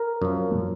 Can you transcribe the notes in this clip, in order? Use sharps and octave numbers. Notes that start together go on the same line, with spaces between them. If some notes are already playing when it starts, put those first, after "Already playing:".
Already playing: A#4
F#2 F3